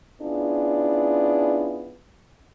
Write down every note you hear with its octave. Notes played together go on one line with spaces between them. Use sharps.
B3 C#4 D4 E4 F4 G#4